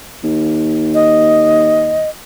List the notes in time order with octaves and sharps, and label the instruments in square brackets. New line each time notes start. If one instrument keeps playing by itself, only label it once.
[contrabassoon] D#2
[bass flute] D#5